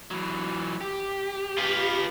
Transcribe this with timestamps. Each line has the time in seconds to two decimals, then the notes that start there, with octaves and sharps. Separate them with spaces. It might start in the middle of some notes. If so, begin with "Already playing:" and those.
0.11 E3 F#3
0.81 G4
1.58 F4 B4